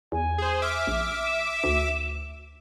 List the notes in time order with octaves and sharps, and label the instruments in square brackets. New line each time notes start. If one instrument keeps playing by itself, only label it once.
[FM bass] E2 [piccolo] G#5
[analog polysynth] G#4 C5
[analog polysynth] E5 D6 [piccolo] F6
[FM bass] A#1
[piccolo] E7
[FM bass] D2